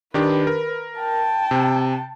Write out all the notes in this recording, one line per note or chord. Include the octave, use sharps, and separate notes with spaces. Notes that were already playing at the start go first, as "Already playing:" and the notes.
D#3 D4 G4 B4
A#4
G5 A5
C3